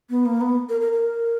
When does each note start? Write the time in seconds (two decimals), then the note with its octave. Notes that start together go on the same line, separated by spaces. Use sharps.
0.10 B3
0.26 A#3
0.41 B3
0.69 A#4
0.81 A#4
0.92 A#4